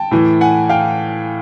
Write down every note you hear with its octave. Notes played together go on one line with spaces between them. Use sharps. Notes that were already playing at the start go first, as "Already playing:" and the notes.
Already playing: G5 A5
A2 E3
F#5 G#5
F5 G5